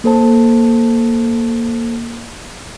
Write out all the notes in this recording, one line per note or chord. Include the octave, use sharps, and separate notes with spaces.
A#3 A4 C5 A5